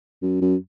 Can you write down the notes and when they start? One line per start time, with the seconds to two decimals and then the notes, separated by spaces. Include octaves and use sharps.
0.22 F#2
0.42 F#2